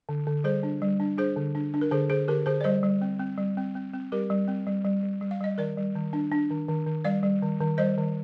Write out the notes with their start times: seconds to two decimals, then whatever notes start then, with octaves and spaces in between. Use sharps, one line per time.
0.09 D3
0.27 D3
0.44 G3 G#4 C5
0.63 D4
0.82 G3
1.00 D4
1.18 D4 G#4 C5
1.36 D3
1.55 D4
1.74 D4
1.81 A#4
1.91 D3 G#4 C5
2.10 D3 G#4 C5
2.28 D3 G4 A#4
2.46 D3 G#4 C5
2.61 D5
2.64 G3 C5 D#5
2.83 G3
3.01 C4
3.19 C4
3.38 G3
3.57 C4
3.75 C4
3.93 C4
4.12 G3 G4 A#4
4.30 G3
4.48 C4
4.67 G3
4.85 G3
5.03 G3
5.21 G3
5.31 F5
5.41 G3 D#5
5.58 D#3 A#4 D5
5.77 G3
5.95 D#3
6.13 D4
6.31 D4
6.51 D#3
6.68 D#3
6.86 D#3
7.04 G3 D5 F5
7.23 G3
7.42 D#3
7.61 D#3
7.78 G3 C5 D#5
7.97 D#3